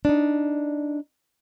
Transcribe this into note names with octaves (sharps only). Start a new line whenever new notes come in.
D4 D#4